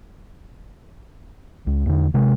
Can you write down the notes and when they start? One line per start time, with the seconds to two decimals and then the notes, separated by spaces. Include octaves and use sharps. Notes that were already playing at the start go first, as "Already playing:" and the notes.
1.67 C#2
1.86 E2 D3
2.14 C3 G#3